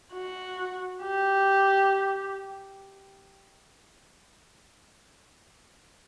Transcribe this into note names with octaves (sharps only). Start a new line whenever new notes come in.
F#4
G4